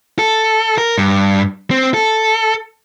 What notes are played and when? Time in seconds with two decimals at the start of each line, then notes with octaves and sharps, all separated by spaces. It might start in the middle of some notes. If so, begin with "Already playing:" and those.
0.19 A4
0.78 A#4
0.98 G2
1.71 C4
1.94 A4